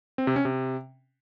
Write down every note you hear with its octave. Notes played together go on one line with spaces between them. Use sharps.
C4
C3
C#4
C3